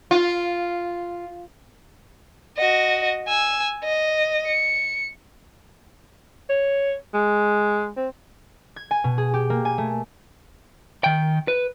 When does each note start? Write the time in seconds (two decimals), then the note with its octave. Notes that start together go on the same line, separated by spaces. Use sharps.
0.11 F4
2.58 F#4 D#5
3.27 G#5 E6
3.84 D#5
4.47 C#7
6.49 C#5
7.14 G#3
7.97 C4
8.76 G#6
8.91 G#5
9.04 B2
9.18 G#4
9.34 G4
9.50 A#3
9.65 G#5
9.78 A3
11.04 D#3 G5
11.48 B4